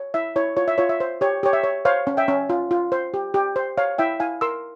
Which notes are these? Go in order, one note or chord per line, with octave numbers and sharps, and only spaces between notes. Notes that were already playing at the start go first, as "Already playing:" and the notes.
Already playing: C#5
E4 E5
E4 C#5
F4 C#5
E5
F4 C#5
E5
C5
G4 C#5
G4 C#5
E5
C#5
C5 C#5 F5
C#4
E5 G5
C#4
F4
F4
C5
G4
G4
C5
C#5 F5
E4 E5 G5
E4 F5 G#5
A#4 C6 E6